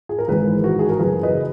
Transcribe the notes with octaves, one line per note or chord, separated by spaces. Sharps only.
G#4
A#4
G#1 G#2 E3 G#4 B4
F#4 A#4
G#4
A#4
F#1 F#2 E3 G#4 B4
B4 D#5